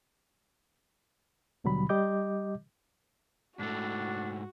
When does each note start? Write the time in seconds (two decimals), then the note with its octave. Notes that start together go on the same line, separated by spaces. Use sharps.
1.64 D#2 B2 D3 F#3 G3 B5
1.89 G3 G4 D#5 D6 G6
3.59 G#2 A3 D4 F#4